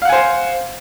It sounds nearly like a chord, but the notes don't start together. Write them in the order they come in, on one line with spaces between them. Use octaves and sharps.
F5 F#5 G#5 C5